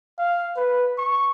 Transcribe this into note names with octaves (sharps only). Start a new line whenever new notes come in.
F5
B4
C#6